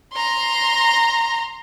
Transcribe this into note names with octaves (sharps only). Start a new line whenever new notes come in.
A#5 C6